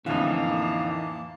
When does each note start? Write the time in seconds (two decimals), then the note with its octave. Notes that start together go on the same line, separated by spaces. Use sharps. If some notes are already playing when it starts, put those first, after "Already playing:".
0.06 F2 A2 D3 E3 A#3 D#4 F5 A5